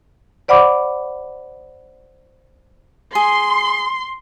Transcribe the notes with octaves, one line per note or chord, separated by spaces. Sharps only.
C5 D5 F#5 B5 D6
G#4 C6